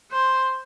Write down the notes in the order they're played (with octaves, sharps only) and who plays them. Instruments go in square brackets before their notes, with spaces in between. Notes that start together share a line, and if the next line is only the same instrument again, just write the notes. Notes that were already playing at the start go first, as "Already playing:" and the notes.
[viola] C5